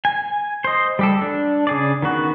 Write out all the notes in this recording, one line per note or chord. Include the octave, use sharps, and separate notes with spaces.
G#5
C5 D#5
G3 G4 A4
D4
C#3 G#4 D5
D#3 B3 F#4